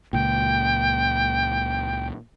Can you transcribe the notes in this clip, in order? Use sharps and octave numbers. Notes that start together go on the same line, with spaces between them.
C#2 A#2 G5